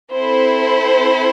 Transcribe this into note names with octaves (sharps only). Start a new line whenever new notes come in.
C4 E4 A4 C5